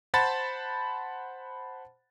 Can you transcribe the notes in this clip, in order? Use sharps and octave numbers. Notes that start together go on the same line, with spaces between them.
C5 F#5 A5 B5 A6